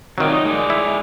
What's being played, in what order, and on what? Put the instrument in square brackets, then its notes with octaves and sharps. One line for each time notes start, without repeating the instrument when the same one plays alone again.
[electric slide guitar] C3 F4 D5 [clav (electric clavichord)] D#3 F#3
[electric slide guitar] D#4
G#3 D5
[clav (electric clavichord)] E4